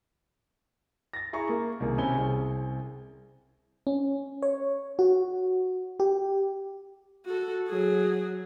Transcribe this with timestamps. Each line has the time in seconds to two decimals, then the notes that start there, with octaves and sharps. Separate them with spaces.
1.13 A6 A#6
1.33 E4 G#4 E5 A#5 C#6
1.49 A#3
1.80 C2 D#3 A#3 G#4
1.98 C3 C4 C#4 G#5 B5 G7
2.15 C2 C4 G#4
3.87 C#4
4.42 C#5
4.99 F#4
6.00 G4
7.26 F#4 A4
7.68 F#3 G#4